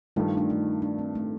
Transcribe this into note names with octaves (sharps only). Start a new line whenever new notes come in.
G2 D#3 A3 F4
D4
D#4
D4
C4
A3